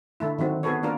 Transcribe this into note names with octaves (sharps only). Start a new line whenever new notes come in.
D3 A3 E4
D#3 F#3 C4 F#4
B3 F#4 G#4 A4 B4 C#5
A#3 D4 F4 A#4